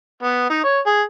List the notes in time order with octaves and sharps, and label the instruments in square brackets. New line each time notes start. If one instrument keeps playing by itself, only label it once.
[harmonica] B3
D#4
C#5
G#4